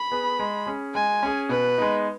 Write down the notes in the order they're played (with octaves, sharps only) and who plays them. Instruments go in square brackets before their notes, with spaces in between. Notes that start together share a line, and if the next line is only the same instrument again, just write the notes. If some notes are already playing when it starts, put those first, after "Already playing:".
Already playing: [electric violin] B5
[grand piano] B3 G#4 B4
G#3
C#4 G#4
[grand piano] G#3 [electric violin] G#5
[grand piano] C#4 G#4
[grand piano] B2 [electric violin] B4
[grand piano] G#3 B3 D#4